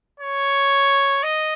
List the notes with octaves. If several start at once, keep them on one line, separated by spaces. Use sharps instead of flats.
C#5
D#5